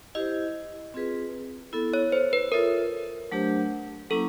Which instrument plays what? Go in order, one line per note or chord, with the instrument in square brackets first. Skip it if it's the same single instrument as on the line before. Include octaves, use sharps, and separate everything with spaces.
[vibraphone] E4 G4 C5 [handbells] D#5
[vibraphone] C4 F4 G#4 B4
B3 E4 A4
[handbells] C#5
C5
B4
[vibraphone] F4 A4 C#5 E5 [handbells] A#4
[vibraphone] F#3 A3 D4 G4 C5
[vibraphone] F#3 A#3 C#4 E4 [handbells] A4